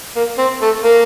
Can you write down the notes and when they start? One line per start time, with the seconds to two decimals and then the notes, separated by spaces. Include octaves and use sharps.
0.16 A#3
0.38 C4
0.62 A3
0.84 A#3